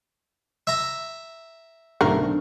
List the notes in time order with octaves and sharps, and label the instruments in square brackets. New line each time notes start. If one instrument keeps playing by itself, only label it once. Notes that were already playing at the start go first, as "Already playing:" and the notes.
[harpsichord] E5 A#5
[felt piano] B1 D3 [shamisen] A3 C4 A#4